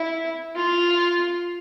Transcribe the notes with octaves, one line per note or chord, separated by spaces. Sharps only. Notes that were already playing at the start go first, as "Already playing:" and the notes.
Already playing: E4
F4